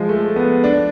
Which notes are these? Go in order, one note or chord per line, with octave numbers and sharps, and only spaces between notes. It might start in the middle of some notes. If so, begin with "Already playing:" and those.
Already playing: F3 G#3
A3
B3
D4